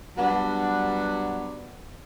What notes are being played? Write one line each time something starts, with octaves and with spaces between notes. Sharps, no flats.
F#3 G3 B3 D4